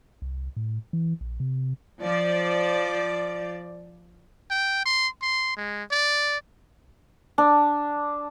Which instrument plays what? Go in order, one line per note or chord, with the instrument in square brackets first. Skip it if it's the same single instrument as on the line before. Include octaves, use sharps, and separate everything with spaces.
[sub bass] C2
A2
E3
A#1
C3
[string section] F3 D5
[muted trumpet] G5
C6
C6
G#3
D5
[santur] D4